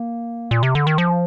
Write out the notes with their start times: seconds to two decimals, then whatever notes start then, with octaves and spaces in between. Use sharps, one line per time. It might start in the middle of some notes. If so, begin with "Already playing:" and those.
Already playing: A#3
0.51 A#2
0.63 C3
0.75 D3
0.87 D#3
0.98 F3